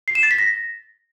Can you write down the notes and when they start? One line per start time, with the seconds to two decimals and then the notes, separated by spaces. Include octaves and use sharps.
0.08 C7
0.15 E7
0.23 A6
0.31 B6
0.38 A#6